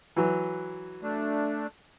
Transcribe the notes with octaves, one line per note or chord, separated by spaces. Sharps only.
E3 F#3
A3 D4